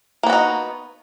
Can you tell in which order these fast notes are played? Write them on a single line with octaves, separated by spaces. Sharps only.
A#3 B3 F#4 D#4